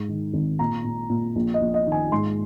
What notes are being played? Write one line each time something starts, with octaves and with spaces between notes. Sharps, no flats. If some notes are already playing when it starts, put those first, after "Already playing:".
Already playing: G#2
D#3
G#1
A#2 A#5
A#2
A#2
A#1
D#5
A#1
D#5
D#3
G#5
G#2 C6